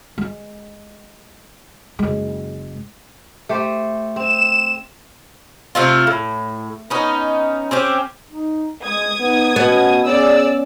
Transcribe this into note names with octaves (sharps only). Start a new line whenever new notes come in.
G#3
F#1 G#3
A3 G4 C5
C4 E7
C3 A3 F4
A2
B3 C#4 D#4
C4 C#4 G4
D#4
G#3 D#6 G#6
B3 D#4
B2 B3 C#4
C#4 G#4 D5 E6